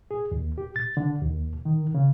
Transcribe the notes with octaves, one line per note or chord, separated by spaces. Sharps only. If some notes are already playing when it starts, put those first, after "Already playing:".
G#4
D#2
G4
A6
D3
D#2
D#3
C#3